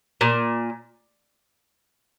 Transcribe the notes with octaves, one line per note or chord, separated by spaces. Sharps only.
A#2